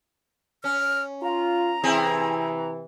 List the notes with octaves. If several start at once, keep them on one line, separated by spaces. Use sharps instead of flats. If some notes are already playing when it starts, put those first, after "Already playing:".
C#4 F6
F4 A#5
C3 E3 C4 E4 G#4